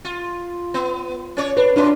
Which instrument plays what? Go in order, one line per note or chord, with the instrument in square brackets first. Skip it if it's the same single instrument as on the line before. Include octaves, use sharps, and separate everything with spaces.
[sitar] F4
B3
C#4 C#5 D5
[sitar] D4 [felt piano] B4
[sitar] F#2 F4 B4 [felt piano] D4